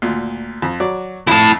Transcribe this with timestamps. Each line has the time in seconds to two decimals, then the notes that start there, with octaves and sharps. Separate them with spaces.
0.02 D2 A#2
0.62 F2
0.80 F#3 D5
1.27 F2 E4 A5